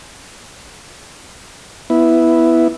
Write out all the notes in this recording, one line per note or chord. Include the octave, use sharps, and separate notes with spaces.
B3 E4